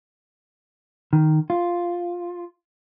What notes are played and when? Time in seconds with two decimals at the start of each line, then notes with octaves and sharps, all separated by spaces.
1.13 D#3
1.50 F4